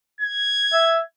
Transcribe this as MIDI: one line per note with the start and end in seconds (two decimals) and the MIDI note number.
0.21 1.02 92
0.73 1.00 76